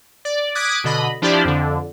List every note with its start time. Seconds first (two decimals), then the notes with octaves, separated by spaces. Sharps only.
0.25 D5
0.55 D6 D#6 F#6 G#6 B6 D7
0.84 B2 D3 D#5 B5
1.22 F3 D4 E4 G4 C5 D5
1.45 F2 D3